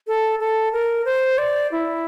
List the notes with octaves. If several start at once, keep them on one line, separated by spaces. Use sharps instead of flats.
A4
A4
A#4
C5
D5
E4